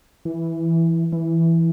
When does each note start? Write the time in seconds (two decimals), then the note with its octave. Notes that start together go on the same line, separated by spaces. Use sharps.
0.25 E3
1.12 E3